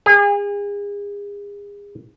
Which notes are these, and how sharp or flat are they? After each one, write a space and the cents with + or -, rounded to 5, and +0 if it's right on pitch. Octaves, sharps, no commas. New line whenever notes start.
G#4 -35